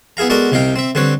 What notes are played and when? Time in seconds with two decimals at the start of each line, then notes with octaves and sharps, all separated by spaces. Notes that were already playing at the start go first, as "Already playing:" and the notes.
0.17 B3 E4 G#4 F5 A#5
0.30 G#3 B3 F#4 A4 A#4 D5
0.52 C2 C3 D#4 D#5 F5 G5
0.76 C4 E5
0.95 D3 G3 C4 B4 C#5